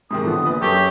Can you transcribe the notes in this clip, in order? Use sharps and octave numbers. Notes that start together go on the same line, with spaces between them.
G#2 C3 D#3 D#6
D3 F3 B3
A#1 B4
F#2 G4 A4 C#6